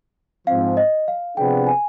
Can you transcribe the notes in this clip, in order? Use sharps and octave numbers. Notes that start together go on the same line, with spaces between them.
G#2 F3 C4 F5
D#5
F5
C3 F3 B3 D4 G#4 G5
G#5